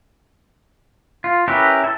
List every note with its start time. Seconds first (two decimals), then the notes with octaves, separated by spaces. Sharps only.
1.24 F4
1.48 C#4 E4 G4 A#4 B4
1.84 E4 A4